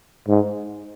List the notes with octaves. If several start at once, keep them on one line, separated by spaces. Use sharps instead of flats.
G#2